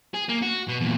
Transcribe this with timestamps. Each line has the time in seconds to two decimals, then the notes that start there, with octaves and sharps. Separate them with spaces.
0.14 G#4
0.29 A#3
0.42 F#4
0.68 B2
0.81 E2 A#2